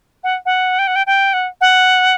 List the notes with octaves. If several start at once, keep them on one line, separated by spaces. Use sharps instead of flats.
F#5
F#5
G5
F#5
G5
G5
F#5
F#5